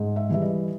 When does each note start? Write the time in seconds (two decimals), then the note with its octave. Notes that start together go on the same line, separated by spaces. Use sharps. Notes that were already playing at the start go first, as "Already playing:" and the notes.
Already playing: G#2
0.16 E5
0.29 E3 G3 E5
0.42 D#5